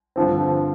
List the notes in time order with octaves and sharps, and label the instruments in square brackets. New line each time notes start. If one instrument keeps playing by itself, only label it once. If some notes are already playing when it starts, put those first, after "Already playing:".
[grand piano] G2 D3 F3 C4